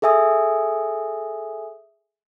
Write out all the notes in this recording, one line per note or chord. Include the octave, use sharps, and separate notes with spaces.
G#4 A4 E5 G#5 D#6